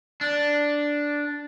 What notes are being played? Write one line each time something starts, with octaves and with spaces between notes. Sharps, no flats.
D4